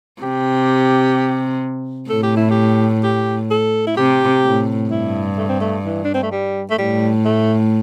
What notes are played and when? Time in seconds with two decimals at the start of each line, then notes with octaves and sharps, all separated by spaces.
0.22 C3 G4
2.09 A2 A4
2.23 G4
2.36 E4
2.50 G4
3.04 G4
3.50 A4
3.87 E4
3.97 C3 G4
4.44 A2
4.90 G2 E4
5.37 A3
5.49 C4
5.60 A3
5.85 E3
6.04 D4
6.14 C4
6.22 A3
6.32 G3
6.70 A3
6.78 A2 G3
7.25 A3